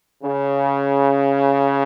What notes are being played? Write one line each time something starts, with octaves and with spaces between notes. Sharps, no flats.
C#3